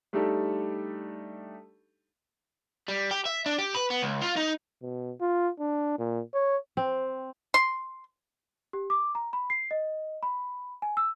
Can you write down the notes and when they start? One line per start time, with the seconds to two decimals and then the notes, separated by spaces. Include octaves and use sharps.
0.13 G3 A3 D4 D#4 G4 A4
2.88 G3
3.11 G4
3.26 E5
3.46 D4
3.58 G4
3.75 B4
3.91 B3
4.03 C#2
4.22 F4
4.37 D#4
4.82 B2
5.21 F4
5.60 D4
5.99 A#2
6.34 C#5
6.77 C4
7.54 C6
8.73 G4
8.90 D6
9.15 A#5
9.33 B5
9.50 C7
9.71 D#5
10.23 B5
10.82 G#5
10.97 E6